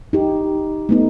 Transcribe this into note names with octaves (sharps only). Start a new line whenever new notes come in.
D#4 G4
A3 B3 D#4